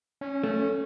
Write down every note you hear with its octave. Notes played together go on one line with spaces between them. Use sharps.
C#4
A3 C#4